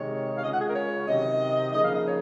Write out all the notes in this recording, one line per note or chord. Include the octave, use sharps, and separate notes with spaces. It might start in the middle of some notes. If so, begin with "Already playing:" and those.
Already playing: C3 D#3 G#3 C#5
F5
C#3 G#3 C#4 F4 D#5
F#5
G#4
A#4
C#5
C3 D#3 F#3 D#5
C#3 F3 A#3 D#4 D#5
F5
D#5
C#5